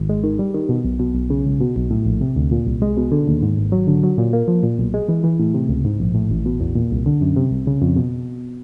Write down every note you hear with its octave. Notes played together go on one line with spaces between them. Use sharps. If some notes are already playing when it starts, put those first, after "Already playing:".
Already playing: G#1
G#3
D#3
G3
D#3
B2
B1
B2
B1
C#3
C#2
B2
B1
A2
A#1
C3
D2
A#2
C2
G#3
B2
D3
D#2
G#2
G#1
F#3
D3
F#3
A#2
A#3
F3
A#2
B1
G#3
E3
E3
A2
C3
C#2
G#2
A#1
A2
A1
B2
E2
A#2
C2
D3
F#2
C3
C2
C#3
F2
B2